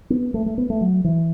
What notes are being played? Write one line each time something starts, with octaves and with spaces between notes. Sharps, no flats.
B3
A3
A3
B3
A3
F#3
E3